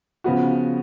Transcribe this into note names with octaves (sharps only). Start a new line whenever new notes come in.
C#3 F3 B3 F#4